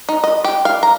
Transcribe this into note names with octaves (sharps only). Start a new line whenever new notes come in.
D#4
D#5
G4
F5
A#5